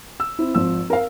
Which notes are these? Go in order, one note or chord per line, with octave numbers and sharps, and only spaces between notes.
E6
C4 E4
G#1 F3 E6
A#4 F5